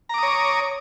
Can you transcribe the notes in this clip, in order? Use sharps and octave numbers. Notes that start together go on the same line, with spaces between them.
C#5 A#5 D6 D#6